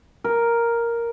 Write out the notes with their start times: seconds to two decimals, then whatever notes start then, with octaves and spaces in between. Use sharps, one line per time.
0.24 A#4